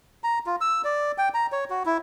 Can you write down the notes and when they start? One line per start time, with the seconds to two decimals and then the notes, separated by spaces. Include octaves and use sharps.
0.24 A#5
0.46 F4
0.61 E6
0.84 D5
1.18 G5
1.34 A#5
1.52 C#5
1.70 F#4
1.86 E4